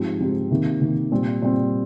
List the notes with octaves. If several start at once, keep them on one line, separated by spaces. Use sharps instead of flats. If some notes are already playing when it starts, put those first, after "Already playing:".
Already playing: G#2 F3 C4 D#4 G4
G#2 F3 C4 D#4 G4
C3 D#3 A#3
C3 D#3 A#3
A#2 G3 C4
A#2 G3 C4